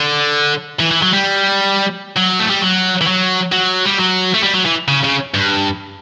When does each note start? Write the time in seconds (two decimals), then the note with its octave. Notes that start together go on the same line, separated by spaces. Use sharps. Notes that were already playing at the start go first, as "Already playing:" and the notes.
Already playing: D3
0.80 E3
0.91 E3
1.03 F#3
1.13 G3
2.16 F#3
2.40 A3
2.50 G3
2.61 F#3
3.01 E3
3.07 F#3
3.52 F#3
3.86 G3
3.98 F#3
4.35 A3
4.43 G3
4.54 F#3
4.65 E3
4.88 C#3
5.04 C#3
5.34 G2